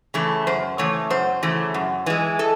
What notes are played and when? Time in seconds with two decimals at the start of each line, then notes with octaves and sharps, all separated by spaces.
0.14 C#3 E3 A3
0.47 F#2 C5
0.78 C#3 E3 A3 C#5
1.10 F#2 C5
1.43 C#3 E3 A3
1.74 F#2
2.06 E3 G#3
2.39 A4